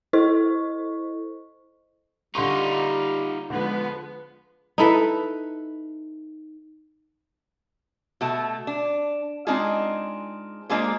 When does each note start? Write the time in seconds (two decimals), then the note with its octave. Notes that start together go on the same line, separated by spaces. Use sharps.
0.13 E4 A4 C5 D#5 C#6
2.35 D3 G3 D#4 F4 C6 C#6
3.50 D3 F3 G#3 B3
4.78 D#4 E4 A4 B4
8.21 B2 A3 A5
8.67 D4
9.47 G#3 C4 D4 D#4 F4 G#4
10.69 G#3 A#3 D4 F4 G#4 C5